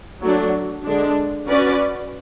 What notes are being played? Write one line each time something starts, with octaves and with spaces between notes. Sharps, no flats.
F#3 A3 D4
D3 G#3 D4
C#4 F#4 B4 D5